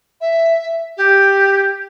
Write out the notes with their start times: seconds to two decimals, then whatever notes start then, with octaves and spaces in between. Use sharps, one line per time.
0.21 E5
0.97 G4